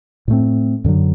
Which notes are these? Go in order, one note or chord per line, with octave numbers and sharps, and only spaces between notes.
A2 F#3 A3 C4
F#2 D3 F#3